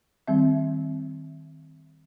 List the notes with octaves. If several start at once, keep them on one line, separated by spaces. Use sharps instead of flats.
D#3 G3 C4 E5